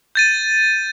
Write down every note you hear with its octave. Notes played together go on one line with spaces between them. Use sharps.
G6 A6 D#7